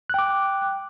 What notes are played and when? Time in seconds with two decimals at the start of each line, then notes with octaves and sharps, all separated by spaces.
0.10 F#6
0.14 G5
0.19 D6